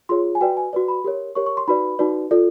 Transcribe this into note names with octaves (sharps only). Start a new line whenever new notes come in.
F4 G#4 C#5 C6
G#5
F#4 B4 D5 G5
G#5
F#4 B4 D5
B5
G4 A#4 C#5
G4 A#4 C#5 C#6
C#6
C6
D#4 F#4 B4 D5 B5
D#4 F#4 B4 D5
F4 A4 D5